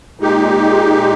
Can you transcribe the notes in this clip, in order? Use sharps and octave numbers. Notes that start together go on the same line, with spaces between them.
A#2 G#3 D#4 G4